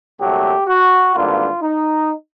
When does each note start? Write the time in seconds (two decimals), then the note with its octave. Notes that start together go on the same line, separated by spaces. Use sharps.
0.20 C2 A#2 F#3 A3 G4
0.67 F#4
1.14 G#1 G2 D3 F3 A#3 F4
1.62 D#4